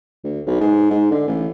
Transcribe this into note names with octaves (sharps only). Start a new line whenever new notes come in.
D2
B1
G#2
G#2
D3
A1